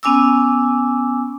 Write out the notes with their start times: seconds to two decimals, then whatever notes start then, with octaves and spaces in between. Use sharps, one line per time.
0.03 B3 C#4 G#5 D6 E6